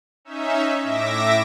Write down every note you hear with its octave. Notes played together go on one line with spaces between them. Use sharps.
C#4 D#4 E5
A2 E5 D6 A#6